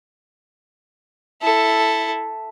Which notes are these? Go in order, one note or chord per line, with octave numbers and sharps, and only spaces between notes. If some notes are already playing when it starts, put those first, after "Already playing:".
E4 A4